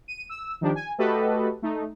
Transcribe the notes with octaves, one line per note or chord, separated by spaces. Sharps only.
D#7
E6
D#3 F3 D4 G4
G#5
A3 F#4 G4 A4 B4 D#5
A3 D#4